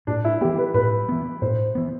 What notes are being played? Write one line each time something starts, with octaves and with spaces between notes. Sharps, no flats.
A2 D4
E4
E3 B3 G4
B4
A2 B4
E3 B3
A2 C5
E3 B3